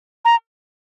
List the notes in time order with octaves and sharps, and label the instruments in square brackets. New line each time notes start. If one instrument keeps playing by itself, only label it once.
[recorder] A#5